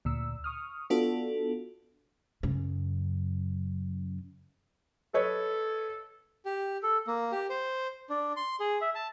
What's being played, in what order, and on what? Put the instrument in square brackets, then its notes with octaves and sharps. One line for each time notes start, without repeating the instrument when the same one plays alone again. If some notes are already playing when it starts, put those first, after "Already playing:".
[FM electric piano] D2 A#2 E6
C#6 D#6 F6
B3 D4 F4 F#4 A4
[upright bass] F#2 C#3
[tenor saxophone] A4 [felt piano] B4 C#5 D#5
[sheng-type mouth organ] G4
A4
A#3
G4
C5
D4
C6
G#4
E5
A5